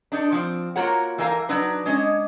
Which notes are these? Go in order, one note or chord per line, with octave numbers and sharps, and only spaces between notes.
D4 D#4 A4
F3 C4
A#3 F4 F#4 A#4 C#5 F#5
E3 G3 A4 A#4 C#5 F5
F#3 D4 D#4 B4
G#3 C#4 D4 D#5